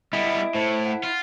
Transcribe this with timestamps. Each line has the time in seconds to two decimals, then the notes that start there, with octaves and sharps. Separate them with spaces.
0.13 G3 B3 E4 D#5 G#5 D7
0.55 A2 C5
0.85 F#5
1.04 F4